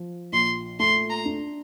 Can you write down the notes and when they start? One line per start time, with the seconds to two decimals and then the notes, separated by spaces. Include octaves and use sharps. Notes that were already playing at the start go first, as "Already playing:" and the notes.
Already playing: F3
0.33 A#1 C6
0.79 A3 C6
1.10 A#5
1.25 D4